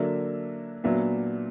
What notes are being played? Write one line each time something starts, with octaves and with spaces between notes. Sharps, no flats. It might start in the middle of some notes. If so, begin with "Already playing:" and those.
Already playing: D3 F#3 A#3 D4 E5
A#2 F#3 B3 D4 E5